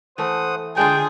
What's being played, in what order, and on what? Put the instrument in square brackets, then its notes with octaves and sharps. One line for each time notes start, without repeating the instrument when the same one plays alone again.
[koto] E3 A3 [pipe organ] C5 F#5 D#6
[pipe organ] D3 [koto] G#3 D4 F4 [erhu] G#4 [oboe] G5